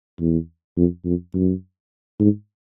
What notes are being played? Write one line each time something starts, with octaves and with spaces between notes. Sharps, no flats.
E2
F2
F2
F#2
G#2